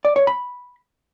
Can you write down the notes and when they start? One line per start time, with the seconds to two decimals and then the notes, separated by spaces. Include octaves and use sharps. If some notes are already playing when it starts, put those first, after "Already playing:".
0.05 D5
0.16 C#5
0.27 B5